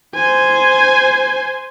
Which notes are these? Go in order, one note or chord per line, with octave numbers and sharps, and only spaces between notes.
C5 G#5